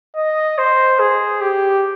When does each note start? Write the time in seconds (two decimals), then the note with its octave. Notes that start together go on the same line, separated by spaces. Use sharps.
0.16 D#5
0.58 C5
0.99 G#4
1.41 G4